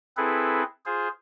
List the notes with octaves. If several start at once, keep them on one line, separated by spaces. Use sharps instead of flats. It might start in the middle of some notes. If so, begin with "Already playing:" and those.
C4 E4 G#4 A4 B4
F4 G#4 C5